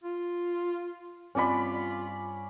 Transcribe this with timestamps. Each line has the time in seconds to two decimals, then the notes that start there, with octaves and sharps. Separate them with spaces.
0.04 F4
1.35 G2 C4 C#4 F4 D5 F#5 B5